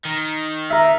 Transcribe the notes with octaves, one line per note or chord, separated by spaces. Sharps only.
D#3
A#4 E5